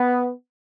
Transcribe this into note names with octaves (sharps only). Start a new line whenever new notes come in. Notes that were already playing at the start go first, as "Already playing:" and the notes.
Already playing: B3